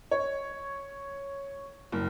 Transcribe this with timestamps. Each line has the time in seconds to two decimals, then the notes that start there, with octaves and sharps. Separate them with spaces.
0.11 C#5
1.92 F#1